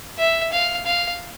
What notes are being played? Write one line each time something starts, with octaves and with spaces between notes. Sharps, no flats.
E5
F5
F5